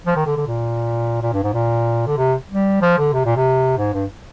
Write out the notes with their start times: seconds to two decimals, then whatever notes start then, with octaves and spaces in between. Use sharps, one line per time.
0.06 F3
0.16 D#3
0.26 D3
0.37 D3
0.47 A#2
1.22 A#2
1.33 G2
1.43 G#2
1.54 A#2
2.07 D3
2.17 C3
2.50 G3
2.81 F3
2.98 D3
3.13 C3
3.25 A#2
3.36 C3
3.77 G#2
3.93 G2